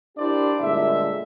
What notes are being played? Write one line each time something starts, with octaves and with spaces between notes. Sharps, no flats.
D4 E4 G4 A#4 C5 D5
G1 A#2 G#3 A3 E5